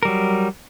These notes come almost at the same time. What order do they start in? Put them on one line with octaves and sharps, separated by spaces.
A#4 G3 F#3